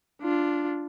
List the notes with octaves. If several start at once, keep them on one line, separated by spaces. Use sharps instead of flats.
D4 F4